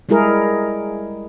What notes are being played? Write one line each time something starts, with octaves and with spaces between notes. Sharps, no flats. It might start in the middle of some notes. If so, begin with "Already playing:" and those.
G3 G#3 E4 G#4 A#4